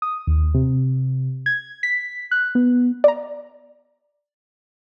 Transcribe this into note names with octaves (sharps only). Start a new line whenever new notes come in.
D#6
D#2
C3
G#6
B6
F#6
B3
D5 A#5